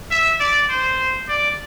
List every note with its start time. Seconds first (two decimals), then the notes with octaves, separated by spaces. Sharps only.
0.11 E5
0.40 D5
0.69 C5
1.28 D5